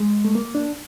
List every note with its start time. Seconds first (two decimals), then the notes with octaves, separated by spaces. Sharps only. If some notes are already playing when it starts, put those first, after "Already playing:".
Already playing: G#3
0.25 A3
0.35 A#3
0.55 D4